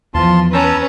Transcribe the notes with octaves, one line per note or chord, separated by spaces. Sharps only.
E2 E3 F3 F4 A5 C6
C#4 B4 A5 A#5 E6